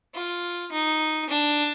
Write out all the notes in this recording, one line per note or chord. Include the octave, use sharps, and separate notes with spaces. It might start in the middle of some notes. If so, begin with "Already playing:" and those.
F4
D#4
D4